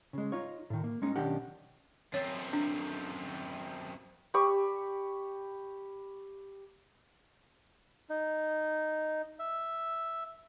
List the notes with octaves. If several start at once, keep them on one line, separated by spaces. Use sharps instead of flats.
C#3 G#3
D#4 F4 C#5
A2 D#3
A#3
G#3 C#4 D#4
B1 D#3 C#4 D4 G4 F#5
F#2 C4 C#5
D4
G4 B5 C#6 E6
D#4
E5